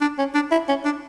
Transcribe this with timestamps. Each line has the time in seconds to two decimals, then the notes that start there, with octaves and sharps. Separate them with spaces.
0.01 D4
0.18 C#4
0.35 D4
0.51 E4
0.69 C#4
0.85 D4